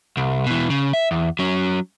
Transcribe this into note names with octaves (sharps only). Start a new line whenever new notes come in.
C2
B2 E3
C#3
E5
E2
F#3 C#4